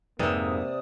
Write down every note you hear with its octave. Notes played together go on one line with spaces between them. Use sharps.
F2 G#2 C3 A#3 B4 D5 D#6